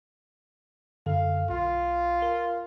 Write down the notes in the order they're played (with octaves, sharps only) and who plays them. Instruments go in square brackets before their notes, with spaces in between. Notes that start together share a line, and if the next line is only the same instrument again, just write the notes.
[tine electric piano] F#2 D3 A4 [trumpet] F5
[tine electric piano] B1 [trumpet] F4
[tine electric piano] A#4